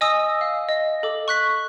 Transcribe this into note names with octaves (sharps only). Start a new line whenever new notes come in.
D#5 G#5 D#6 E6
F5
D#5
A4 D6
C#6 F#6 B6